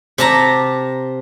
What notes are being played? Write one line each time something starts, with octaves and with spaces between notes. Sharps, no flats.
C3 A5 A#5